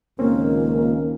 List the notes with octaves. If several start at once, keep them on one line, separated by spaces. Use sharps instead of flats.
C#2 A#2 D#3 A#3 C4 C#4 A#4